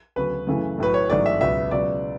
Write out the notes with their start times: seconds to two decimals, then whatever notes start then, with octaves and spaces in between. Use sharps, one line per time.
0.16 D2 C#3 F#3 B3 B4
0.47 F#2 C#3 E3 A3
0.78 B1 A2 F#3 B4
0.94 C#5
1.09 A1 G#2 F#3 A3 D5
1.26 E5
1.40 C#2 B2 F#3 B3 E5
1.71 C#2 B2 F#3 B3 D5